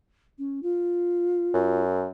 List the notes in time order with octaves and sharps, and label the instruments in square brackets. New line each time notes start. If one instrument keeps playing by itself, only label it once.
[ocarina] C#4
F4
[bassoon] F#2